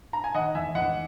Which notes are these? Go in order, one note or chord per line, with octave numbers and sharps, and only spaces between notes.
A#5
G#5
D#3 D#5 F#5
E2 E5 G#5
E2 D#5 F#5